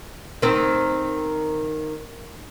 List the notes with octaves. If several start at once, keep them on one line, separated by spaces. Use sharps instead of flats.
D#3 C4